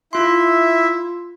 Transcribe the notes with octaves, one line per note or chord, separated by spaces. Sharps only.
E4 F4 E5 C6